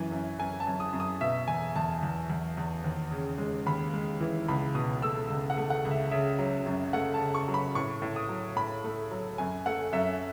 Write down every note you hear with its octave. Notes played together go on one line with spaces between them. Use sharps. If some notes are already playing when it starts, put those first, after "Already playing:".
Already playing: F#2 E3 G#5
F#2
F#2 G#5
A5
F#2
D#6
F#2
D#6
B2 E5
E2 G#5
E2 A5
E2
E2
E2
D#2
C#3
G#3
D#2 B5
G#3
E3
C#2 B5
B2 D#6
A3 E6
C#2
F#5
A3
F#5
C#2
E5
C#3 E5
F#3
F#2
A3 F#5
A5
C#3
C#6
F#3
B5
A2 C#6
A2
D#6
F#3
A2 B5
A3
F#3
F#2 G#5
A3 F#5
F#2 E5